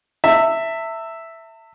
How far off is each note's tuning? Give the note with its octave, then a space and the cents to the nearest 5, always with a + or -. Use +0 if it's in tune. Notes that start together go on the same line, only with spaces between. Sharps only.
E5 +0 A5 +45